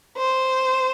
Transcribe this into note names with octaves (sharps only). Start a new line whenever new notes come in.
C5